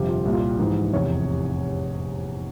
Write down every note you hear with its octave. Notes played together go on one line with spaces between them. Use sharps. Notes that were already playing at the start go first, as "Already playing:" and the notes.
Already playing: G1 F2 C3 G4
F4
C2 A#2 G4
F4
G4
A#1 G#2 E3
F1 E2 C3 C#5